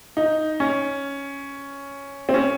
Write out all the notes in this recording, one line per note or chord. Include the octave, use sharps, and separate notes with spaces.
D#4
C#4
C4
C#4